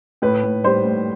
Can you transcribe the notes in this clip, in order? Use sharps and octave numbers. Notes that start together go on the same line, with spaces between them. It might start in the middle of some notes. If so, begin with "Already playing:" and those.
A2 B4
A2
G3 C5
A2